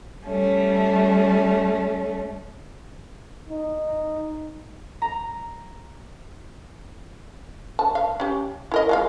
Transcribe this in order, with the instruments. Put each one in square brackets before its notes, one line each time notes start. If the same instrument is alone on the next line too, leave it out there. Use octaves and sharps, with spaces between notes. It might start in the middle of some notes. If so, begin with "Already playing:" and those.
[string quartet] G3 A3 C#4
[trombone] D#4
[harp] A#5
[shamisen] A5
F5
C#4 G4
E4 A#4 D#5
G#3 F4 F5